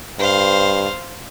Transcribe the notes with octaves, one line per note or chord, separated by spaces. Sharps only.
G2 C5 F5